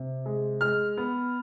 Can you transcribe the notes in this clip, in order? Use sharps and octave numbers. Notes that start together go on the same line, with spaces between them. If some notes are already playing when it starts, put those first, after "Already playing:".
Already playing: C3
G#3
G#3 F6
B3